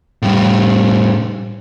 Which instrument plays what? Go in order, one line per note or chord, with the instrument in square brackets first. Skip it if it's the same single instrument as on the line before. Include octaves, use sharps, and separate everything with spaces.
[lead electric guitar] A2 G3